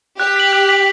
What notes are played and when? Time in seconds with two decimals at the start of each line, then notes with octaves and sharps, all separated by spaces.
0.20 G4 F#6
0.36 B6 F#7
0.53 F#6
0.69 B6 F#7